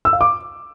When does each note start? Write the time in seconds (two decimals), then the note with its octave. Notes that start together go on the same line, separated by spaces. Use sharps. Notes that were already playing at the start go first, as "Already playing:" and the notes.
0.05 E6
0.13 F5
0.21 D6